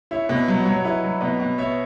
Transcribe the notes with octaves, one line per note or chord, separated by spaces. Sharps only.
E4 C#5 E5
B2
B4 D#5
F#3
C#5 E5
F#3
C#5
E4 B4 D#5
F#3
B2 B4 D#5
B2
B3 C#5 E5